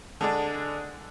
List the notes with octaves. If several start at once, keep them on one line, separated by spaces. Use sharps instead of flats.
D3 G#3 D4